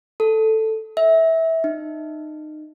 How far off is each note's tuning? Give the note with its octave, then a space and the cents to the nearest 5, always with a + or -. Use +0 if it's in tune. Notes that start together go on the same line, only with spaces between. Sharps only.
A4 +5
E5 -20
D#4 -25